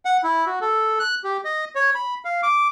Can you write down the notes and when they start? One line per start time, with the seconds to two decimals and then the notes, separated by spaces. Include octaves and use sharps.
0.05 F#5
0.24 E4
0.46 F#4
0.61 A4
1.00 F#6
1.24 G4
1.45 D#5
1.75 C#5
1.95 B5
2.25 F5
2.43 D6